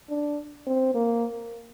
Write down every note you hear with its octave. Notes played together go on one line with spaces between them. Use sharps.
D4
C4
A#3